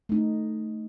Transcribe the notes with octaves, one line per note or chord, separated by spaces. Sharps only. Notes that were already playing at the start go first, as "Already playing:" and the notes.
A3 D#4